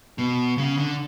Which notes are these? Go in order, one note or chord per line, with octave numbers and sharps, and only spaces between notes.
B2
C#3
D3